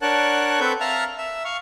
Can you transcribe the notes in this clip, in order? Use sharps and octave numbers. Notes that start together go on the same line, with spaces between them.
D4 A#4 C#5 F#5 A5 F#6
C4 A4 B4 F#5 C#6 G6
E5 F5 A5 A#5 F6
E5
F5 C#6